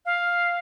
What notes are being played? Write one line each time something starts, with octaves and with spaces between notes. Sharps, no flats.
F5